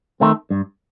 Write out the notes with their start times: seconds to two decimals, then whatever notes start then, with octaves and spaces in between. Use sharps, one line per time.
0.20 D#3 A3 C4
0.50 G2